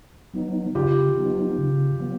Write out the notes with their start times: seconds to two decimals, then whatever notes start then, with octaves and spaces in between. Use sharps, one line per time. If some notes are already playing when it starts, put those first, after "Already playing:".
0.33 F#3 B3 D#4
0.75 C#3 F4 G4
1.17 F#3 B3 D#4
1.58 C#3
2.00 F#3 B3